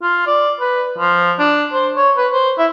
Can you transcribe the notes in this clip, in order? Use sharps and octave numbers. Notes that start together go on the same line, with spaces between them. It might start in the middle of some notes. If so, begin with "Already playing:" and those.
F4
D5
B4
F3
D4
C5
C#5
B4
C5
E4